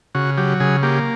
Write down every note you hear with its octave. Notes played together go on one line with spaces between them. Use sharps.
C#3 F#4
F#3 G4
C#3 G#4
A#3 G4